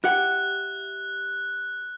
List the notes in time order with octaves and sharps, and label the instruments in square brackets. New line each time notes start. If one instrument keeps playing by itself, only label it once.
[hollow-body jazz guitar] E4 G4 F#5 [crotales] F#6